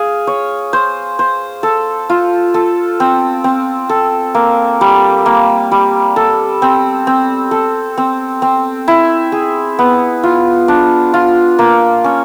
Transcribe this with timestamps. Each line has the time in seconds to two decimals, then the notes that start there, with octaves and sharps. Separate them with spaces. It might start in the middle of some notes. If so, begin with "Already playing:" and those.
Already playing: G#4 F5
0.27 C#5
0.73 C5
1.19 C5
1.63 A4
2.10 F4
2.54 A4
3.00 C4
3.44 C4
3.89 A4
4.35 A#3
4.81 G3
5.26 A#3
5.71 G3
6.16 A4
6.62 C4
7.07 C4
7.51 A4
7.98 C4
8.42 C4
8.88 E4
9.32 G#4
9.79 B3
10.23 F4
10.68 D4
11.14 F4
11.59 A#3
12.04 C#4